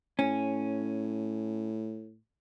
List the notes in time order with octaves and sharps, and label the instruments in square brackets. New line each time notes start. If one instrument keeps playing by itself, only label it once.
[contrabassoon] A2 [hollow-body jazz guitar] C#4